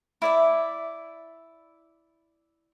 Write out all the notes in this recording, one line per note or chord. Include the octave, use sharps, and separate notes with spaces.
E4 D5 E5